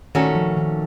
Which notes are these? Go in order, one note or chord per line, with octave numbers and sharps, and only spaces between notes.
A#2 D#3 A3 C#4 F#4 A4
F3
D#3